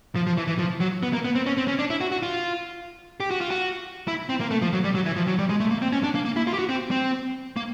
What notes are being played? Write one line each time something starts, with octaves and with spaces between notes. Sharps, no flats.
F3
F3
E3
E3
F3
F#3
B3
A#3
B3
C4
C#4
C4
C#4
D4
E4
F#4
F#4
F4
G4
F#4
F4
F#4
E4
C4
A#3
A3
F3
F#3
G3
F#3
E3
F3
F#3
G3
G#3
A3
A#3
C4
C#4
D4
A#3
A#3
E4
F4
G4
F#4
C4
C4
A#3